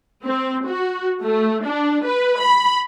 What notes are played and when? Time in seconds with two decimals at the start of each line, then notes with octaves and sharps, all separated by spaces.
0.25 C4
0.66 F#4
1.22 A3
1.66 D4
2.06 B4
2.40 B5